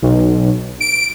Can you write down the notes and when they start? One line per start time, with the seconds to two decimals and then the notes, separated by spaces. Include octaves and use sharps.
0.02 B1
0.80 D7